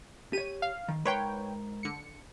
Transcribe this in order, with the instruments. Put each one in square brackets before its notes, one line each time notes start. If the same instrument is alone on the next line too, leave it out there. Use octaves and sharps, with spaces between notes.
[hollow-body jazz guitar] G4 C#5 [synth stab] D#7
[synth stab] F5
[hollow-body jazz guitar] D#3
[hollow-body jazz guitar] G#2 A#4 C6 [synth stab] B4 C#5 G5
[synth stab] D3 C#7